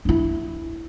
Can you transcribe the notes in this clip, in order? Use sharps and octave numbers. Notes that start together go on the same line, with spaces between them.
D4 E4